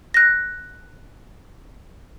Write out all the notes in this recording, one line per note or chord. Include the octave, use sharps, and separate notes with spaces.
F#6 A#6